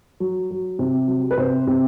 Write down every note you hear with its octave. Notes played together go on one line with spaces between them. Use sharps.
F#3
F#3
C3
F#3
B4
C3 C5
C3